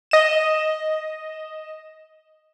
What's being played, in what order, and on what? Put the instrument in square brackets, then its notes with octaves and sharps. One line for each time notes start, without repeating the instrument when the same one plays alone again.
[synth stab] D#5 E7